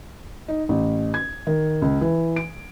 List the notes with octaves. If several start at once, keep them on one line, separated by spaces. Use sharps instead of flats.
D#4
A1
G#6
D#3
C#2
E3
D7